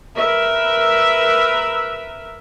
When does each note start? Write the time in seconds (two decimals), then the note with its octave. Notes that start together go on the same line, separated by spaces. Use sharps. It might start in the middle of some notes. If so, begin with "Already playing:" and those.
0.16 A#4 B4 E5